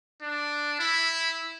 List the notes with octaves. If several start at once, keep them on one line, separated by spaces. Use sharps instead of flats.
D4
E4